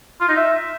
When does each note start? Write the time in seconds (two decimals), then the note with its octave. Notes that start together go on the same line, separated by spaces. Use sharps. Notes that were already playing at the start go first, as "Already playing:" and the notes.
0.21 F4
0.28 D#4
0.36 E5